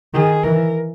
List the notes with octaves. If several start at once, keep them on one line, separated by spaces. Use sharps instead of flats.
D#3 G#4
E3 A#4